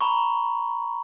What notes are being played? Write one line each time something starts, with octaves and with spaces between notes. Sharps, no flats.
A#5 B5 C#6